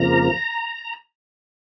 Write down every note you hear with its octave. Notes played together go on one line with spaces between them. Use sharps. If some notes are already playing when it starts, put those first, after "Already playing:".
Already playing: F2 C#3 F3 A#3 A#5